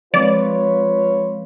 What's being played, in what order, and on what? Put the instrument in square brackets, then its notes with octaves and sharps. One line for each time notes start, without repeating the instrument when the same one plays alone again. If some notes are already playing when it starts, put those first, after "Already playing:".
[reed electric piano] F3 G#3 C4 [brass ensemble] F4 B4 C#5 [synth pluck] D5